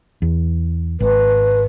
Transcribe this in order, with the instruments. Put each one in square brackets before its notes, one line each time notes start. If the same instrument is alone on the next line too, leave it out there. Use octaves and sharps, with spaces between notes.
[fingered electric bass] E2
[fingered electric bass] G#1 [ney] B4